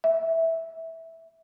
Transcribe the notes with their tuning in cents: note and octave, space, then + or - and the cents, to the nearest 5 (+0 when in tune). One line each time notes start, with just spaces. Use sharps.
E5 -10